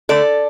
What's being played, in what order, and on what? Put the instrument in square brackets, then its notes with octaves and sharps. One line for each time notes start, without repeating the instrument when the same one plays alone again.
[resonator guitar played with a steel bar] D3 A3 A4 D5